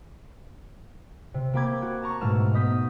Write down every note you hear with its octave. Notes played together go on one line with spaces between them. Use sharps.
C3
A#3 C4 G4 B5 D6 G#6
F#4
A5 A#5 C#6
G#2 B2 A3 F6 E7
B3 D#5 D#6 G6 B6